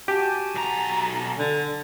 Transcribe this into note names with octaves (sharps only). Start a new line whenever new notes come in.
F#4 G4 G#5 A5
B1 A#5
D3 A4